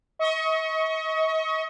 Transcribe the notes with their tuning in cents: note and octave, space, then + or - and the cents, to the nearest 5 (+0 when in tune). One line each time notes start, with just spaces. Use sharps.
D#5 +35 C#6 +0